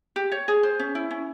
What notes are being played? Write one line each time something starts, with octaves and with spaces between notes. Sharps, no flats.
G4
C#5
G#4
C5
C#4
E4
C#4